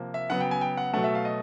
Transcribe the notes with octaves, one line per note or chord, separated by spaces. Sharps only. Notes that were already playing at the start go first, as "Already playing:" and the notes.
Already playing: C3 F3 A#3
E5
C#3 F#3 B3 F#5
G5
G#5
G5
F#5
B2 F#3 A3 F#5
E5
F5
D#5